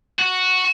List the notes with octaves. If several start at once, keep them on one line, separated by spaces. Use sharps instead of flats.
F#4